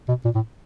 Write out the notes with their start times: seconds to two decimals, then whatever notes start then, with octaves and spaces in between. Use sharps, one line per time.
0.08 B2
0.25 A#2
0.35 A2